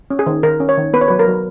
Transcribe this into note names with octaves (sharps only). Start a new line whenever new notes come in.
C#4
G#4
D#3
D#3 A#4
C#4
C#5
D#3
B3 B4
C#5
F#3 B4
A#4
F#3